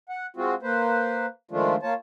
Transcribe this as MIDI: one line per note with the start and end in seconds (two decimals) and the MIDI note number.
0.09 0.26 78
0.36 0.54 56
0.36 0.54 60
0.36 0.54 65
0.36 0.54 66
0.63 1.26 58
0.63 1.26 71
0.63 1.26 72
1.51 1.75 51
1.51 1.75 53
1.51 1.75 56
1.51 1.75 57
1.51 1.75 62
1.51 1.75 65
1.83 1.94 58
1.83 1.94 65
1.83 1.94 73
1.83 1.94 81